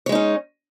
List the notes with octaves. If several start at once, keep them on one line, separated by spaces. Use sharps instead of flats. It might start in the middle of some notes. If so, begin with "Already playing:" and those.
G#3 C#4 D#4 C#5